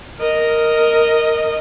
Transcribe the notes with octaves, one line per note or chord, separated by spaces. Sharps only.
A#4 D#5